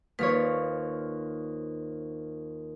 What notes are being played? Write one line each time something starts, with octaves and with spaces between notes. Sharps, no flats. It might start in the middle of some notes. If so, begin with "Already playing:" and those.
D#2 F3 B4 C#5